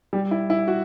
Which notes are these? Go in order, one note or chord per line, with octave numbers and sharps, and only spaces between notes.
G3
E4
E4
F#4